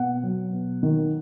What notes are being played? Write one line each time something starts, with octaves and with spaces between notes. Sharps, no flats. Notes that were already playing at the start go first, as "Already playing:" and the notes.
Already playing: B2 F#5
F#3
B2
D#3